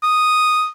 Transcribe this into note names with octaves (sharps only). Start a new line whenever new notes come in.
D#6